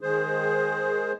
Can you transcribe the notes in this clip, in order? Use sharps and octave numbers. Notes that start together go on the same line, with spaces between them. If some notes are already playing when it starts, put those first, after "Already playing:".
D#3 G#3 G#4 C5